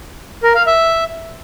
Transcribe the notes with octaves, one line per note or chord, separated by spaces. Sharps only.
A#4
F5
E5